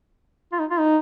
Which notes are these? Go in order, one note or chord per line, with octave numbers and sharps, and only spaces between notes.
F4
D#4
F4
D#4